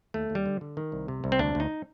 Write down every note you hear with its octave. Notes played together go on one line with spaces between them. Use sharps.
D#2 A3
D#2
G3
D3
D3
D#3
C2
C3
C2
C4
D2 D4
D2 D#4